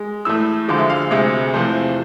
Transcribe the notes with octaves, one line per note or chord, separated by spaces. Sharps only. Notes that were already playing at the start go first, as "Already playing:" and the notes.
Already playing: G#3
A2 E3 A3 E6
D2 D3 F3 G#3 D6
E5
F5
D2 C3 G#3 E5
E2 C3 F3 A3 C5